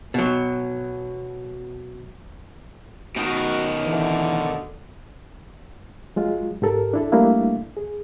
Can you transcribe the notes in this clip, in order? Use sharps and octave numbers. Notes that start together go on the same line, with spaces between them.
B2 F#3
B2 D#3 F#4
D3 E3
F#3 G#3 F4
G#2 G4 A4 A#4
D4 E4 A4
G3 A3 A#3 D4 E4 F5
G#4